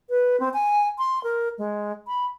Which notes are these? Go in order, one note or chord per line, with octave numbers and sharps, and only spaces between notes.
B4
C4
G#5
C6
A#4
G#3
B5